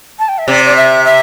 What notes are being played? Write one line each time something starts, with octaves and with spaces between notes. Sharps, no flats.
A5
G5
E5
C3 D5
D5
E5
E5